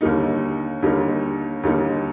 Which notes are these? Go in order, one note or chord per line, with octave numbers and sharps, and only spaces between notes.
D#2 D3 G3 A#3 D#4
D#2 D3 G3 A#3 D#4
D#2 D3 G3 A#3 D#4